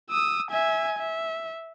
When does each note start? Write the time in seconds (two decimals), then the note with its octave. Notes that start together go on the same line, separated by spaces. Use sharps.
0.10 D#6 E6
0.51 E5 G#5
0.98 E5